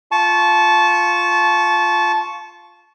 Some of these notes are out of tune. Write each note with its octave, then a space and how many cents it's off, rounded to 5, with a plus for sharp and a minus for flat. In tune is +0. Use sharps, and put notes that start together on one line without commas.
F4 +0 A5 -20 C#6 +0